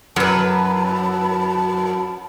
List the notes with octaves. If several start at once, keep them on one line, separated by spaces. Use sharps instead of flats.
F#2 F#3 B4 A5 B5